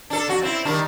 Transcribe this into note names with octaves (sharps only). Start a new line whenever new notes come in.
D4 A4
F2 F#4
C4 E4
D#3 G3 D4